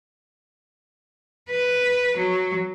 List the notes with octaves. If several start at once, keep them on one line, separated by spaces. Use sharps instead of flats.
B4
F#3